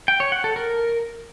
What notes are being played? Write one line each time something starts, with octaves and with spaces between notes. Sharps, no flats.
G5
C#5
F#5
A4
A#4